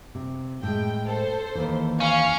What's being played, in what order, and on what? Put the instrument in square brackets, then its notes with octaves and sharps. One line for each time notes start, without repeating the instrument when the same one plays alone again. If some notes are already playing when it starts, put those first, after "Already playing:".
[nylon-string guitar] C3
[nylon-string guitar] A2 G#3 [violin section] G5
[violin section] A4 C5
[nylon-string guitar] D#2 E3
[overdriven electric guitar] C#4 [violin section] F5 C#6 F6